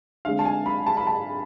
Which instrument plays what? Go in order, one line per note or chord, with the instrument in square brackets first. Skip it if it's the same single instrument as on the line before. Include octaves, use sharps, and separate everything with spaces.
[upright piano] D3 G#3 C4 F5
A5
G#5
B5
A5
B5
A5